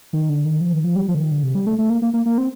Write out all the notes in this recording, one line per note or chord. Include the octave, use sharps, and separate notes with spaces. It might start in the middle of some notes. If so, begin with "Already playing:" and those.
D#3
D3
D#3
F3
D#3
F3
G3
F3
D3
D#3
D3
C3
G3
A3
A3
A#3
A#3
A#3
A#3
C4